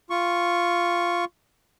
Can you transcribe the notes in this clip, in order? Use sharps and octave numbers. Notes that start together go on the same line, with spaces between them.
F4 C#6